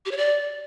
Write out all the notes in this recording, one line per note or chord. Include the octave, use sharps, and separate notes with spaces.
G4
C#5
D5